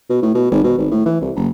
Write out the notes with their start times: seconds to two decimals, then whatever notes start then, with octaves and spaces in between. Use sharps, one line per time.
0.10 B2
0.23 A2
0.35 B2
0.51 G#1
0.64 B2
0.78 G#1
0.92 A2
1.06 E3
1.21 C2
1.36 F#1